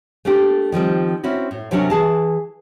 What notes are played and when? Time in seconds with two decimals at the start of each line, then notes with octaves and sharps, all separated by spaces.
0.25 A3 A#3 D4 G4
0.72 D#3 F3 G3 C4
1.24 C4 C#4 E4 F#4
1.51 A2
1.71 C3 F#3 C#4 D4 F#4 A#4
1.90 E3 G#4 A5